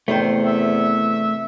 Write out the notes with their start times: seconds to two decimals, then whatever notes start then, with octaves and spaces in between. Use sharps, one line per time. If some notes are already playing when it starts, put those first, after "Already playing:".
0.08 E2 C3 D#3 A3 C5
0.46 E5